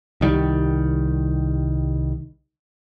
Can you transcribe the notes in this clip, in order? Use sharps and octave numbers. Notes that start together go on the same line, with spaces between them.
C2 D#3 F3 G3